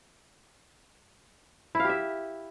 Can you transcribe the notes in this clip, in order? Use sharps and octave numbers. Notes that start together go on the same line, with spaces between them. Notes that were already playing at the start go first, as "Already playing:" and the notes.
E4 G4 E5 F5